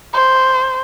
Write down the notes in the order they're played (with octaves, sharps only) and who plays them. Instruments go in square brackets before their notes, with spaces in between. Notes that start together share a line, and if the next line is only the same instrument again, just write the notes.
[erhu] C5